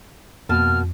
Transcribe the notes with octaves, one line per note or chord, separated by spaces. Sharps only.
F2 B2 A#3 A5 F6